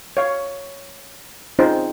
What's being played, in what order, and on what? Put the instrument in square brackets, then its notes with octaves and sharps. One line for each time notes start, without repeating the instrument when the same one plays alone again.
[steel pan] C#5 F5
C4 C#4 D#4 F4 G#4 C5